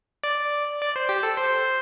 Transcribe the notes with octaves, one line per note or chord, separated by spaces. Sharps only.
D5
D5
C5
G4
A4
C5